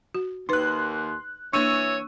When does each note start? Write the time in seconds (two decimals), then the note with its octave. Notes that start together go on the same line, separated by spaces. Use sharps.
0.15 F#4
0.49 D#2 D#4 B4 C6 F#6
1.53 E3 A#3 D4 C#5 C#6 E6 D#7